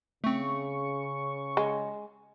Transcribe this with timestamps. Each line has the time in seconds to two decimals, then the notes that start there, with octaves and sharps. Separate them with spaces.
0.24 C#3 A3 C4 C#6
1.57 G#3